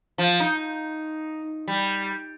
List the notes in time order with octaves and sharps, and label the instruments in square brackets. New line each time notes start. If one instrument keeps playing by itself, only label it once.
[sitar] F3
D#4
G3